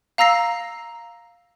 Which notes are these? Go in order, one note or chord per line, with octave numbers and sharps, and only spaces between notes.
F5 A#5 E6 A#6 C7